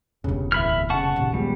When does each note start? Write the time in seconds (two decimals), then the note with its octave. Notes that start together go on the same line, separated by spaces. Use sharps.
0.24 E1 G2 C#3 E4
0.52 D1 E3 E5 B5 F6
0.90 F1 C#3 F#5 A5 C#6
1.16 A#1 D#2
1.34 F3 G3 G#3 B3